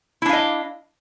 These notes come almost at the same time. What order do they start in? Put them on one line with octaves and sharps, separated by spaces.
E4 D4 F5 D#5